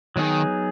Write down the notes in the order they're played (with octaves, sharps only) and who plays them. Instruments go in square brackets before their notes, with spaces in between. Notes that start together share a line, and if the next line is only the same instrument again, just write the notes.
[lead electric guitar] D#3 [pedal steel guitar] F#3 B3 D#4 G#4